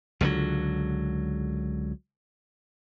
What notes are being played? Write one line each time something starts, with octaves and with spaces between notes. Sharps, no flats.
C#2 D3 E3 F#3